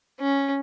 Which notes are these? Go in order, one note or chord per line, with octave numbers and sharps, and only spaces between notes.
C#4